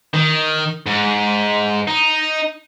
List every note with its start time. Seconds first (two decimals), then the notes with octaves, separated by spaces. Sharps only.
0.14 D#3
0.86 G#2
1.88 D#4